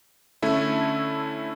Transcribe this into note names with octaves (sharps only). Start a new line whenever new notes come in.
D3 A3 C#4 E4